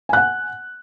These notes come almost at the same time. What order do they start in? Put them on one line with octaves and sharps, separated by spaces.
G#5 F#6 F#5